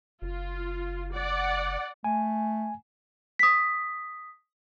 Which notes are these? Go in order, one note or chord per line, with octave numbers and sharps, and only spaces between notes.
F#1 F4
D5 F#5
A3 G#5
D#6 B6